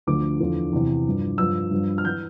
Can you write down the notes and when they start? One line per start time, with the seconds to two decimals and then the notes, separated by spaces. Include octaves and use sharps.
0.07 D2 D3 F3 D6
0.40 E2 D3 F3
0.73 E2 C3 E3
1.06 G2 F3
1.38 G2 F3 E6
1.71 G2 F3
1.98 F6
2.05 E3 G6